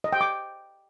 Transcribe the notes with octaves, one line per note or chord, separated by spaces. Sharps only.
D#5
G5
D6